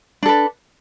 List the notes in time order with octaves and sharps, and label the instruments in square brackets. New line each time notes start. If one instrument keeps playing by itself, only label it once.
[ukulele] D4
A4
B4